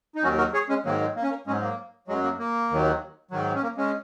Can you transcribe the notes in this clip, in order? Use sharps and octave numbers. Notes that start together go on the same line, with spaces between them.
D#4
D#2 D#3 F#3 C#4 F#4
F#4 A#4
G#4 C#5
G#3 C#4
G#2 D#3 F#3 A#3
G#3
A#3
C#4
A#3
G#2 F#3 G#3 C#4
A#3
F#2 F#3 G#3
A#3
A#3
D#2 D#3 F#3
G#2 D#3 F#3
C#4
A#3
G#3 C#4